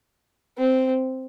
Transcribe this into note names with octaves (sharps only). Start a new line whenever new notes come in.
C4